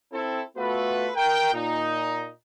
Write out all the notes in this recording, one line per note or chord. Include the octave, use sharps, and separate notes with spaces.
C4 E4 A4
A3 B3 F4 F#4 A4 B4
A#4 G5
A#2 D#4